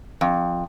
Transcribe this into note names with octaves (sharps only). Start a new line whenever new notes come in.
F2